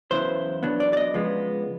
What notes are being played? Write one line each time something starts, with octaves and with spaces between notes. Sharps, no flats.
E2 C#3 F#3 B3 E4 C5
B2 F#3 B3 D4
D5
D5
D#5
C#3 F3 G#3 B3